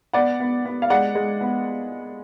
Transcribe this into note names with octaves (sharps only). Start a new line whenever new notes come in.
B3 D5 F#5
B3
B3
F5
G#3 D5 F#5
G#3
B3